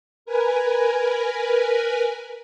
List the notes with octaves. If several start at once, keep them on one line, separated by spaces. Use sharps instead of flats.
A#4 B4 G#5